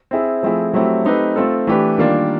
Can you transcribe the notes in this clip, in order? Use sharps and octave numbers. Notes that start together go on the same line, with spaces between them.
C4 E4 G#4
F3 A3 C4 E4 G#4
F#3 A3 C4 E4 G4
A3 C4 D#4 G4 B4
A3 C4 F4 A4
E3 A3 D4 G4 B4
D#3 G3 A#3 D4 F4